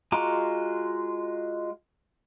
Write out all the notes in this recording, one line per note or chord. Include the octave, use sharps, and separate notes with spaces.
G#3 F4 F#4 A#5 D6